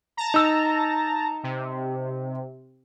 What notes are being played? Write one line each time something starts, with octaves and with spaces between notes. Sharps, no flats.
A5 A#5
D#4 E6
C3